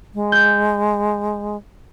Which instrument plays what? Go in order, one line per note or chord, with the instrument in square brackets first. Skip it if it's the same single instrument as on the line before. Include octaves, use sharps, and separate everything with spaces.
[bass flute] G#3
[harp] G6